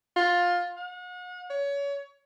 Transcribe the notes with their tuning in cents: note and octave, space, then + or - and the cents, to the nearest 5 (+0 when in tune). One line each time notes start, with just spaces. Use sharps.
F4 +15
F#5 -40
C#5 +25